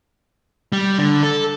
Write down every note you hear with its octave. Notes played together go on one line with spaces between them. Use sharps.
G3
D3
A4